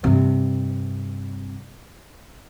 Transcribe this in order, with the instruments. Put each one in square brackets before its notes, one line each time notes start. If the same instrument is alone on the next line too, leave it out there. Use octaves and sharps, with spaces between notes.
[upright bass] G2 C3